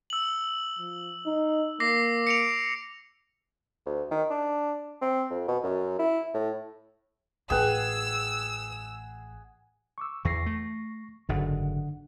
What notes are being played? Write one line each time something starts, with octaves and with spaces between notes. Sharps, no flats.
E6 F#7
F3
D#4
A#3 D6 A#6 C7
C#7 D7 F7
D2
D#3
D4
C4
F2
B2
F#2
E4
A2
A1 F4 G#4 B4 F#5 G5 E6
C#6 D6 E6
E2 E3 C#6 A#6 C7
A3
F#1 G#2 D3 D4 F#5